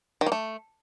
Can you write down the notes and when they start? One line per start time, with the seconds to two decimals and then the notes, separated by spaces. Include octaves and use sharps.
0.21 D#3
0.26 A#3
0.32 A3